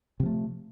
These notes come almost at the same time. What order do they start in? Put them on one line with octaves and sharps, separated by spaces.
C3 F3 A3